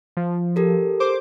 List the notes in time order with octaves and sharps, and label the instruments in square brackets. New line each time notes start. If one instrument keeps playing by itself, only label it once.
[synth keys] F3
[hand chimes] G4 A4 A#4
[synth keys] C5 D6